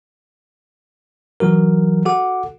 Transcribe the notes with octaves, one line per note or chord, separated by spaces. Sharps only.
E3 F#3 F#4 A#4
F#4 A4 F#5 D6